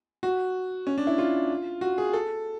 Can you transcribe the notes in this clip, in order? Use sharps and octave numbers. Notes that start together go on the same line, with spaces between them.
F#4
C#4
D4
E4
F4
F#4
G#4
A4